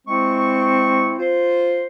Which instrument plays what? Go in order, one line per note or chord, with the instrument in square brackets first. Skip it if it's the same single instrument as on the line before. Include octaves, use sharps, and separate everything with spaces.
[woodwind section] G#3 E4 C#6 [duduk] C4
[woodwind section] F4 C5